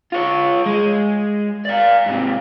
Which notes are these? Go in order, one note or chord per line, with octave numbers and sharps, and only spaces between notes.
F4 C#5
G#3
D5 F5
G#2 C3